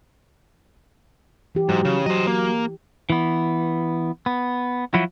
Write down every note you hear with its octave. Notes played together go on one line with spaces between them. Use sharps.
E3 G4
G#2 F#3
C#3
F#3 C5 D#5
A#3
E3 B3
B3
F3 F#3 E4 F#4